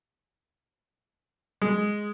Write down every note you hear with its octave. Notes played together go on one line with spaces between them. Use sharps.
G#3